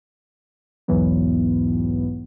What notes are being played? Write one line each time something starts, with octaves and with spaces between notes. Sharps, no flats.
B1 E2 G#2 E3 F#3 B3